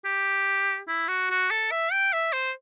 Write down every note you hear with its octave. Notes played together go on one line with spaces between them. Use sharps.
G4
E4
F#4
F#4
A4
E5
G5
E5
C5